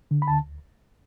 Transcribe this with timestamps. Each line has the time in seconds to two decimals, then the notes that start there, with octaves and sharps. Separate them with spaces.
0.11 D3
0.22 B5
0.28 D2 A5